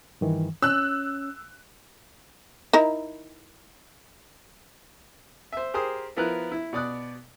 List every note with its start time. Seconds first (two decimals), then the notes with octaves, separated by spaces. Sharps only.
0.21 G2 D#3 E3
0.62 C#4 E6 F#6
2.73 D#4 E4 A#4
5.52 C5 E5
5.74 G4 G#4 A#4 C5 D#6
6.16 F3 B3 E4 A#4 B4 F#6
6.52 E4
6.73 B2 D5 D#6 F#6